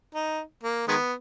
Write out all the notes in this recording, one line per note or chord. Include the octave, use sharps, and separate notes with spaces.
D#4
A#3
D#3 G#3 B3